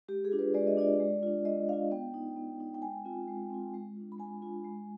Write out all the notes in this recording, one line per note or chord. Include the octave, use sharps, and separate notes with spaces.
G#3 G4
G#4
D4 F4
B4
G#3 D5
D#5
D4 F4 D5
G#3
D4 F4
G#3 D#5
D4 F4 F5
B3 G5
D#4
B3
D#4
G5
G#3 G#5
C4 F4
G#3
C4 F4
G#3
D4 F4
B5
G#3 G#5
D4 F4
G#3